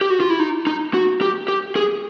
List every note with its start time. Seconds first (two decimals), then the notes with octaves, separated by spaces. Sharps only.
0.01 G4
0.10 F#4
0.20 F4
0.30 E4
0.39 D#4
0.67 D#4
0.94 F#4
1.21 G4
1.48 G4
1.76 G#4